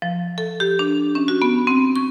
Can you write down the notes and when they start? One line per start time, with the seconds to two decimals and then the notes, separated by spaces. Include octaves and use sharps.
0.02 F3
0.38 A4
0.60 G4
0.79 D4
1.15 C#4
1.28 F#4
1.42 B3
1.67 C4
1.96 C#6